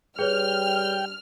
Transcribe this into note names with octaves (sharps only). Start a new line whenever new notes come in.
G3 G#4 B4 C#5 G5 F6